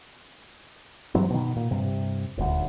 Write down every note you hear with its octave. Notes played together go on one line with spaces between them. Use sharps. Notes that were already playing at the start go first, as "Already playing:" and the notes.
G2 E3 F#3 C4
B2 D#3
A#2
G2 C3
D#1 D2